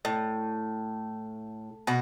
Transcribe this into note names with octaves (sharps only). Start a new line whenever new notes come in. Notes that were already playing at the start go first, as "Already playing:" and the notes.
A2
B2 F#4